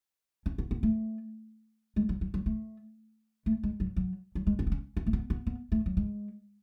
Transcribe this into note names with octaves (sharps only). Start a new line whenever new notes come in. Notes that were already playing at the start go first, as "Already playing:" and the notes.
C#4
B3
B3
A3
G#3
F#3
F#3
F#3
A3
A3
G#3
F#3
F#3
F#3
G#3
C#4
B3
C#4
C#4
A3
B3
B3
B3
A3
F#3
G#3